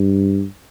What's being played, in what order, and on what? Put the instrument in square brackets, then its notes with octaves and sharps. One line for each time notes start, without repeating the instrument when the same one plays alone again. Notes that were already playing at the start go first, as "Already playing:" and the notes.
Already playing: [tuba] G2